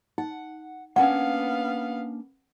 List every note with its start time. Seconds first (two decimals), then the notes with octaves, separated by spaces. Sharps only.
0.18 D#4 F#5
0.96 A#3 B3 C#4 D4 F5 F#5